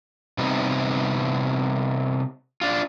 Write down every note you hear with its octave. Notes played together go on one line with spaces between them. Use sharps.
C3 G3 B3 D#4
D4 F4